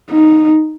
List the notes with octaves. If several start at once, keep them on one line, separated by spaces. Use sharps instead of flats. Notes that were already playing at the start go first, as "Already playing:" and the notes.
D#4